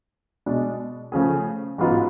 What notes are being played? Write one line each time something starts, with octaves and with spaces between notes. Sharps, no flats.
B2 G#3 D4
C#3 F3 A3 C#4 G#4
A1 G#2 F#3 B3 F4